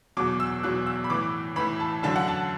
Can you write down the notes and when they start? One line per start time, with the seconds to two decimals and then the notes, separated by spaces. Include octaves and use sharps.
0.17 E2 B2 F#3 D6
0.40 E6
0.63 E2 B2 F#3 F#6
0.86 E6
1.04 B5
1.10 A2 E3 D6
1.56 A2 E3 B5
1.80 A5
2.03 F#2 D3 F#3 A5
2.16 F#5
2.28 A5